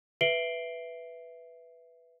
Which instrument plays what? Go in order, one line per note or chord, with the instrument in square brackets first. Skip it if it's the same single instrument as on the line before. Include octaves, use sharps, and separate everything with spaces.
[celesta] B4 E5 C7 D7 F#7 G7